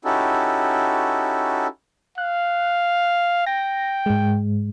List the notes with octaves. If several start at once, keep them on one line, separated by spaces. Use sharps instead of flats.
C#4 D#4 E4 F#4 G4 A4
F5 F#6
G5 A#6
G#2 G#3